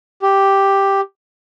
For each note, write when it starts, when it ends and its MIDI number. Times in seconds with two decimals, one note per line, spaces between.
0.22 1.01 67